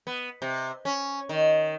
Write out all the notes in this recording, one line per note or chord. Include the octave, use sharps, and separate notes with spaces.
B3
C3
C#4
D#3